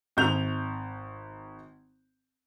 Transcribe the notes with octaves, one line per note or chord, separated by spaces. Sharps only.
G#1 G6 F7